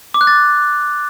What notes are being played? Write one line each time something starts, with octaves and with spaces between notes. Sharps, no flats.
D6
F#6
A6